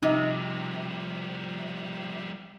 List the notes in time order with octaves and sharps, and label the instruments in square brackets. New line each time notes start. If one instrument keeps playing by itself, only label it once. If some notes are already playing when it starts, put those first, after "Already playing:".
[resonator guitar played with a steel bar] C3 [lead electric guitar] F3 G3 [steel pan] D#4